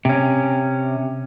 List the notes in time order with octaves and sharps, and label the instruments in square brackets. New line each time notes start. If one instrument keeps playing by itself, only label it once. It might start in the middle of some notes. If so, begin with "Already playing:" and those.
[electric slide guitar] C3 C#4